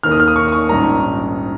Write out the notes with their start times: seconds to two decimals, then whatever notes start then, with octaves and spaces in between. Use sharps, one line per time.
0.03 D#2 D#3 A#3 F6
0.11 D#6
0.20 F6
0.28 D#6
0.36 C#6
0.48 D#6
0.52 C#6
0.69 A#1 G#2 D#3 G3 C#4 A#5